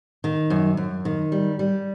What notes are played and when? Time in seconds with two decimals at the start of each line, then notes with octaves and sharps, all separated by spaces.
0.24 D#3
0.50 F#2
0.77 F#2
1.05 D#3
1.32 G3
1.59 G3